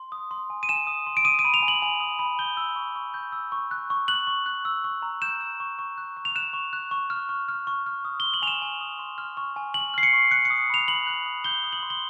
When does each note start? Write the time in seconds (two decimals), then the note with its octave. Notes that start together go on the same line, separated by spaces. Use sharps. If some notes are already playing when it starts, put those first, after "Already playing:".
Already playing: C6
0.12 D#6
0.31 C6
0.50 G#5
0.63 D#7
0.69 G#5 E7
0.87 D#6
1.07 C6
1.17 D7
1.25 D#6 D#7
1.39 D#7
1.45 B5
1.54 F7
1.63 G#5
1.68 F#7
1.82 G#5
2.00 D#6
2.19 B5
2.39 G6 G7
2.57 E6
2.76 C#6
2.96 C#6
3.14 G6
3.32 E6
3.52 C#6
3.71 F#6
3.90 C#6
4.08 F#6 F#7
4.27 C#6
4.46 F#6
4.65 E6
4.84 C#6
5.02 A#5
5.22 G6 E7
5.41 E6
5.60 C#6
5.79 C#6
5.98 F#6
6.17 C#6
6.25 F7
6.35 F#6 E7
6.53 C#6
6.73 F#6
6.91 C#6
7.10 F6
7.29 C#6
7.49 F6
7.67 C#6
7.86 F6
8.05 D#6
8.20 G7
8.24 C6
8.34 F#7
8.42 G#5 F7
8.47 E7
8.62 G#5
8.81 D#6
8.99 C6
9.18 F6
9.37 C#6
9.56 G#5
9.74 G#5 F#7
9.94 F6 C7
10.03 C#7
10.13 C#6
10.31 F#6 C#7
10.45 C#7
10.50 D#6
10.70 B5 F7
10.88 B5 F#7
11.07 F#6
11.26 D#6
11.44 G6 G7
11.64 D#6
11.73 F#7
11.83 C6
11.90 G7